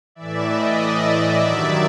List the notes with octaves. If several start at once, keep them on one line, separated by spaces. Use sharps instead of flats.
A2 E3 D5 E5
D#5
D5 E5
G2 D#3 F#3 D5 E5